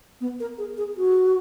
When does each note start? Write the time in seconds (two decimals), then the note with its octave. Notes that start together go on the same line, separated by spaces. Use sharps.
0.21 B3
0.40 A#4
0.58 G#4
0.78 G#4
0.97 F#4